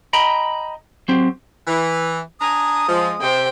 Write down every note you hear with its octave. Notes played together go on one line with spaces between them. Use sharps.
D#5 G5 A#5 B5
F#3 C4 G4
E3
D4 G#5 A#5 D#6
F3 G#3
C3 C5 G5